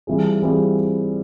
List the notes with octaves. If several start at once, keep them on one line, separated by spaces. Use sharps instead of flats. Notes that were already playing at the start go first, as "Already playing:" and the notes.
E3 G3 C4 F4 G#4
E3 G3 C4 F4 G#4